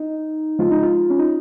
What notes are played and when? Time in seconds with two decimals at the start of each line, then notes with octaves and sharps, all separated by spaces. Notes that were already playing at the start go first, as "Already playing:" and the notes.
Already playing: D#4
0.59 C#3 F3 G#3 F4
0.71 D#4
0.83 F4
1.10 C#4
1.19 D#4